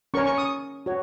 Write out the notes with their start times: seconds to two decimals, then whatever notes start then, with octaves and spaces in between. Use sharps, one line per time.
0.14 C#4 A#4 C#5 C#6
0.26 C#6
0.38 D#6
0.86 F#4 C#5